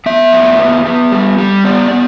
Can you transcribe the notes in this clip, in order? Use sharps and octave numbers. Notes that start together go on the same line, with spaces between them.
B3 E5
F#2
B3
B3
G3
G3
B3 D5
B3